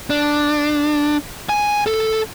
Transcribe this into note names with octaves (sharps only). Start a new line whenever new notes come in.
D4
G#5
A4